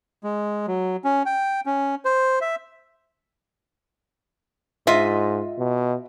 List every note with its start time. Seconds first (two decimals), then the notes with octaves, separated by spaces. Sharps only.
0.24 G#3
0.67 F#3
1.04 C#4
1.26 G5
1.66 C#4
2.05 C5
2.41 E5
4.87 G#2 F4 D#5 E5
5.58 B2